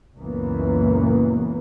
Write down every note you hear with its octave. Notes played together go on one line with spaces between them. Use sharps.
C#2 F#2 A#2 E3 A#3 B3